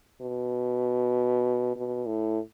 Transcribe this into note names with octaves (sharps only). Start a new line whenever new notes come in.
B2
B2
A2